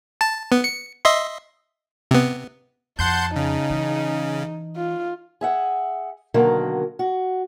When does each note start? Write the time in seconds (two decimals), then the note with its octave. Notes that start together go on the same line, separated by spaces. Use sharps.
0.21 A5
0.52 B3
0.64 C#7
1.05 D#5 E5 C6
2.11 C3 B3
2.99 F2 F#5 A5 C6 G6
3.36 C#3 D#4
3.70 E3
4.77 F4
5.41 G#4 E5 F#5
6.34 B2 D3 D#3 F#3 A#3
6.99 F#4